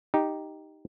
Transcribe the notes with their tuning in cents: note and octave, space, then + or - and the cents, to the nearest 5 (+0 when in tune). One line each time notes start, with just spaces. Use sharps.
D#4 +0 G4 +0